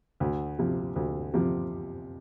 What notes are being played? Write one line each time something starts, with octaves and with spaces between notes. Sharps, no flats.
D2
C3 F3
D2
C3 F3